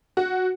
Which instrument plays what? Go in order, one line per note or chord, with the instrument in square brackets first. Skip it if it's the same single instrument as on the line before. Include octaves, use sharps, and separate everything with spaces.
[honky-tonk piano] F#4